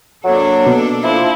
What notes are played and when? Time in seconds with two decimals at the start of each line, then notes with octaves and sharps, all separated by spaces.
0.25 F#3 A#3 D4 A4
0.66 B2
1.04 F3 E4